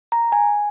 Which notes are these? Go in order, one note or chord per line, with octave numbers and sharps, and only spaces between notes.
A#5
G#5